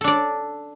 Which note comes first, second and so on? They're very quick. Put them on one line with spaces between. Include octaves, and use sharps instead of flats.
A4 D4 D5